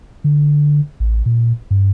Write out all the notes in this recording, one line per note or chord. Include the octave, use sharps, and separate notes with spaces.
D3
A1
A#2
G2